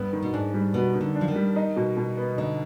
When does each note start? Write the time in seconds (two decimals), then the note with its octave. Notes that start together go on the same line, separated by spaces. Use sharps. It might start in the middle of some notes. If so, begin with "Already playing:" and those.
Already playing: G2 B3
0.13 D#3
0.22 B2
0.33 G#2 D4
0.54 G3
0.74 B2 B3
0.94 D#3
1.01 D3
1.15 D4
1.21 F3
1.28 D#3
1.35 G3
1.56 D#4
1.76 B2
1.97 B2
2.17 B3
2.38 D3 D#4